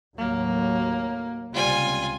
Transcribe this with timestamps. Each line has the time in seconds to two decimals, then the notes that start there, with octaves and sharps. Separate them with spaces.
0.18 D#2 A2 F#3 A#3
1.53 C#2 C3 G3 F4 G#5